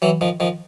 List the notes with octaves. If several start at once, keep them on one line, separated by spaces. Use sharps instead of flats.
E3 F#3
D#3 F3
D#3 F3